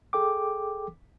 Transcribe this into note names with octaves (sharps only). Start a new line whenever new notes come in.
G#4 A4 G5 D6